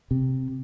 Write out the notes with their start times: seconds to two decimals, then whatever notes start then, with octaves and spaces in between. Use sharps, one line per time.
0.11 C3